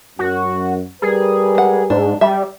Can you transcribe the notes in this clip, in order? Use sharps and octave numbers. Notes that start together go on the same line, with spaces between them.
F#2 F#4
G3 G#4 A#4 B4
G#3 F#5
G#2 D4
G3 E5